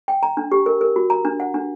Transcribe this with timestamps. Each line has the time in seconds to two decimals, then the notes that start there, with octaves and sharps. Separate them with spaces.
0.08 G5
0.23 A#5
0.37 D4
0.52 G4
0.66 A#4
0.81 A#4
0.96 F#4
1.10 A#5
1.25 D4
1.40 F#5
1.54 D4